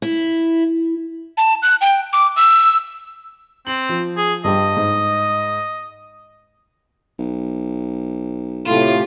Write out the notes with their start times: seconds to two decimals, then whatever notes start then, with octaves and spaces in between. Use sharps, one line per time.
0.02 E4
1.37 A5
1.63 F#6
1.81 G5
2.13 D6
2.36 E6
3.67 C4 F#7
3.89 F3
4.17 G#4
4.44 G2 G3 G4 D#5
4.77 G#2
7.19 B1
8.66 A2 C3 A3 F4 G4